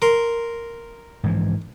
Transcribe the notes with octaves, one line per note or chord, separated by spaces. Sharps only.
A#4 C6
G#2 E3 F3